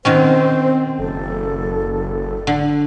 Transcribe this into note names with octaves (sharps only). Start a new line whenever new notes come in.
B2 D#3 C4 C#4 C5
F#1 A4
D3